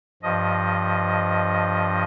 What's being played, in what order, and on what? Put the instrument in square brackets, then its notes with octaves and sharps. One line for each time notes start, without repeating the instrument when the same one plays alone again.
[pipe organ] G2 F3 D#5